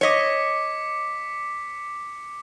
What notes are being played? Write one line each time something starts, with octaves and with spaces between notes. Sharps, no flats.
C#5 D#5 D6 B6 C#7